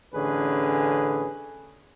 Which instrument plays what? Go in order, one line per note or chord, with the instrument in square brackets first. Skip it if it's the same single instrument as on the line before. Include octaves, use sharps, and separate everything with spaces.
[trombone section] A1 D3 C#4 G#4 B4